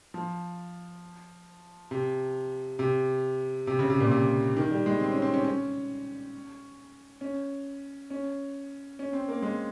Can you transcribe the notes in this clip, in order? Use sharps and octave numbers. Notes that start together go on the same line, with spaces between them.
F3
C3
C3
C3
C#3
C3
A#2
C3
D#3
G3
G#3
C4
C#4
C4
C#4
C#4
C#4
C#4
C#4
C4
A#3
G#3